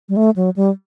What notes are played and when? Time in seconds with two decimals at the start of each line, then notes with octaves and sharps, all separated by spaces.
0.09 G3
0.17 A3
0.36 F#3
0.56 G3